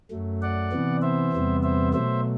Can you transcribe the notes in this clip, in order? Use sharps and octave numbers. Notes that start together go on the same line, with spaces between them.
F#2 F#3 A3
D5 F#5
C3 E3 B3
C5 E5
E2 C3 G3 B3
C5 E5
B2 F#3 A3 C5 E5